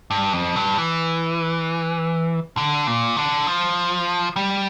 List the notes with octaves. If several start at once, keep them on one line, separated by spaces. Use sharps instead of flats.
G2
F2
G2
E3
D3
A#2
D3
F3
G3